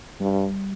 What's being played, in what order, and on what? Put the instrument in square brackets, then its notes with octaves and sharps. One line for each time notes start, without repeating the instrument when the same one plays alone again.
[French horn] G2 [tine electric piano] G3